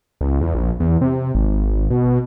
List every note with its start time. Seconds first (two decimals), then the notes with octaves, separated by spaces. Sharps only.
0.21 C#2
0.41 E2
0.54 A#1
0.80 E2
1.01 C3
1.35 G#1
1.90 B2